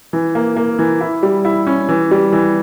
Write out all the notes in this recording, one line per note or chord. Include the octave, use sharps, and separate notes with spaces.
E3
A#3
A#3
E3
E4
G3
E4
C#4
E3
G3
E3